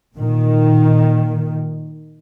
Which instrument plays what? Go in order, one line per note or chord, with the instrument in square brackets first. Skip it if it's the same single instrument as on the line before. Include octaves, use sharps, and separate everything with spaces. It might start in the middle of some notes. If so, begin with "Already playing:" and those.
[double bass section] A#2 D#3